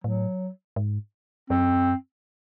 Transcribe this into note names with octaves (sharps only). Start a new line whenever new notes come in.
A2 F#3
G#2
F#2 C4